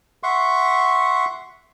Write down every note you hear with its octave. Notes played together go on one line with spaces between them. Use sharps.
E5 F#5 C6 C#6